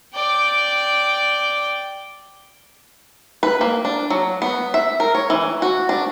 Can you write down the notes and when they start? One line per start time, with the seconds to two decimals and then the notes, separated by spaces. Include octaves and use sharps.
0.15 D5 G5
3.43 B4
3.61 A#3
3.85 D4
4.10 F#3
4.42 B3
4.74 E5
5.00 A#4
5.15 C#5
5.30 E3
5.62 F#4
5.89 D4